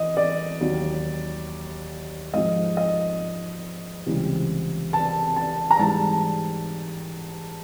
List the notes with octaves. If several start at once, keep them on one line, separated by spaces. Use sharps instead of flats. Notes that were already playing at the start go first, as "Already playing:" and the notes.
Already playing: E3 D#5
D5
D#2 D#3 F#3
G#2 F3 D#5
D#5
C#2 C3 E3 G3
A5
A5
A#5
G#2 E3 G3 A5